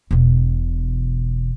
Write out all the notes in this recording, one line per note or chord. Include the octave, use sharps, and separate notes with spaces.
E1 B2